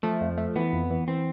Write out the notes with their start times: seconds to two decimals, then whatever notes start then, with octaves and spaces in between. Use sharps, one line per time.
0.03 F3 A3
0.21 F2
0.38 A3
0.56 E3 B3
0.73 F2
0.90 E3
1.08 E3 C4